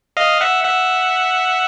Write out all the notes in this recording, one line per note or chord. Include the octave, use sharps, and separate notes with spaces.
D#5 F5
E5 F#5
E5 F#5